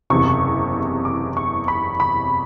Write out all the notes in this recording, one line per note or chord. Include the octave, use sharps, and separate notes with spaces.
F#1 E2 C3 C#6
D6
C#6
B5
B5